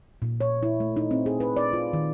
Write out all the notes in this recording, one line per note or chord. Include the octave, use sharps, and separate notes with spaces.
A#2
C#5
E4
A3
D#4
C4
G#4
B4
D5
F4
D#3